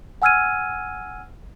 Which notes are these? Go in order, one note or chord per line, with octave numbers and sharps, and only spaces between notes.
F#5 G#5 E6 F6 G#6 D#7